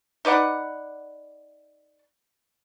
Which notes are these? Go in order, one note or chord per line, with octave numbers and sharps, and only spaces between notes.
D#4 B4 D5 F#5